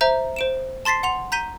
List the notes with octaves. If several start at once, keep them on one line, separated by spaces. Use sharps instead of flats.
C5 E5 A#5 G6
C5 D7 E7
A5 C6 A6 B6 C7
F#5 C6 F7
A#5 G6 B6 D#7 G7